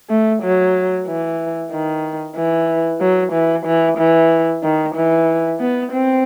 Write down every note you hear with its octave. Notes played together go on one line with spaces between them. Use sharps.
A3
F#3
E3
D#3
E3
F#3
E3
E3
E3
D#3
E3
B3
C4